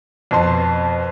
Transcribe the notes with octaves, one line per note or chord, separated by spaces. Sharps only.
F2 B2 A5 C6